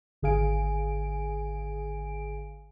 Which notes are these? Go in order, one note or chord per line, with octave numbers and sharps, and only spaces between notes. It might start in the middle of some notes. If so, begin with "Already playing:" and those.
G#1 D3 G#4 F5 G#5 D7